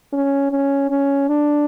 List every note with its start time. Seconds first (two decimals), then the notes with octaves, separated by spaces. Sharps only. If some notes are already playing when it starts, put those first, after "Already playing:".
0.13 C#4
0.51 C#4
0.90 C#4
1.28 D4